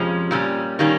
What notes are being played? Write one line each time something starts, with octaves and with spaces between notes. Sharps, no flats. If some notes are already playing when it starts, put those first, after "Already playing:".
Already playing: F2 C3 F3 G#3 C#4
A#2 G3 C#4
D#3 G3 A#3 C#4